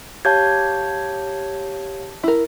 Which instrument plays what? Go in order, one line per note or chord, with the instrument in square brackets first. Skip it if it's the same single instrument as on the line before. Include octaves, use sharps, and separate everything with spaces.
[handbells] G4 C#5 F5 [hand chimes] A5 G6 G#6
[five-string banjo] E4 A#4